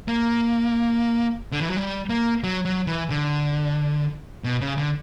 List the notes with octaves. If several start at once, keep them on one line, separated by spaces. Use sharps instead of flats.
A#3
D3
E3
F#3
G3
A#3
F#3
F#3
E3
D3
B2
C#3
D3